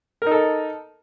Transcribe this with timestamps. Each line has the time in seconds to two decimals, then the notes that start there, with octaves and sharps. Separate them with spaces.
0.22 A#4
0.27 D#4
0.31 A4